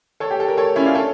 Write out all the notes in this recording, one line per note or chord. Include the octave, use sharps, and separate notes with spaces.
A4 C#5
G4
A4
A#4
A4 C#5
C#4 E4
D4 F4
A4 C#5